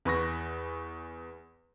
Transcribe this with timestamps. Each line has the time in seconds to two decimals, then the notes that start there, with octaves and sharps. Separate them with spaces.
0.05 E2 B4 C#6 A#6